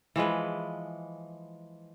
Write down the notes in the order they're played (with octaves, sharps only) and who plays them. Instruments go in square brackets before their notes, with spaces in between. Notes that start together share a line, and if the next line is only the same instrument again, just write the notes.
[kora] E3 F3 G#3 B4